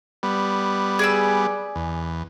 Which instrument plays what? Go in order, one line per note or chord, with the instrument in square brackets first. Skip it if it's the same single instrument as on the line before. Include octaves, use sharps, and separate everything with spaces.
[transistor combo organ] G3 B3
[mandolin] G#4 D5 E6
[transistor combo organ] E2